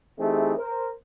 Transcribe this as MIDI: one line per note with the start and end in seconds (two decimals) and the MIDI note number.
0.19 0.54 52
0.19 0.54 57
0.19 0.54 60
0.19 0.54 63
0.19 0.54 67
0.19 0.54 68
0.57 0.88 70
0.57 0.88 72